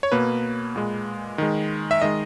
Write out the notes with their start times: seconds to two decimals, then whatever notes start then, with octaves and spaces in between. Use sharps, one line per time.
0.03 C#5
0.12 B2 A#3 B4
0.76 A#2 G#3
1.38 D#3 G#3
1.91 E5
2.02 D#3 G#3 D#5